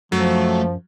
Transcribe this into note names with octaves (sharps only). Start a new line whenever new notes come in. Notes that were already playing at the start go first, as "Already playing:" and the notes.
F#2 F3 F#3 A3